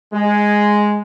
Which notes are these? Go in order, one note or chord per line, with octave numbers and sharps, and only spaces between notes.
G#3